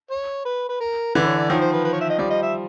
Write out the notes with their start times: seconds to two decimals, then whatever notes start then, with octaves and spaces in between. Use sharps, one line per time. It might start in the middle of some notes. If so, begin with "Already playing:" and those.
0.11 C#5
0.45 B4
0.69 B4
0.81 A#4
1.15 D3 E3 B4
1.27 C#5
1.38 D5
1.50 D#3 F3 C#5
1.61 C5
1.73 B4
1.85 B4
1.93 C#5
2.01 E5
2.10 D#5
2.19 F3 G3 D5
2.31 D#5
2.43 E5